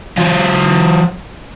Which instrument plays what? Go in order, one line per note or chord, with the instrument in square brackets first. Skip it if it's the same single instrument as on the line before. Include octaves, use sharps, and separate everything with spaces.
[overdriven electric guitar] F#3 F4